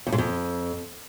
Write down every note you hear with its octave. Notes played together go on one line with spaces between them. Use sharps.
F2
G#2
F2